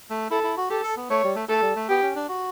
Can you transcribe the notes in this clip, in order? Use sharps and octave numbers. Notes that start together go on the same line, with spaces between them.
A3
E4 A4
E4
F#4
G4 A4
A4
B3
A3 C#5
G3
A3
A3 A4
G3
A3
B3 G4
C#4
D4
F#4